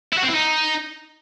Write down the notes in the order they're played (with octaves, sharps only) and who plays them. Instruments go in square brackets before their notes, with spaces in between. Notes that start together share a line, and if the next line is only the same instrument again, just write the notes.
[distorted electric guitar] E4
F#4
C4
E4
D#4